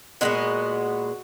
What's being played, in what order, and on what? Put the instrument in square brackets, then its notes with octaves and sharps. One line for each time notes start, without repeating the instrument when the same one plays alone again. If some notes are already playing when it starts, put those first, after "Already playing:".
[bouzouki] A#2 G#3 B3 D#4 F#4